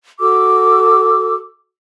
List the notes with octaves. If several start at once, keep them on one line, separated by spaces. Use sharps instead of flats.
F#4 A4 D6 E6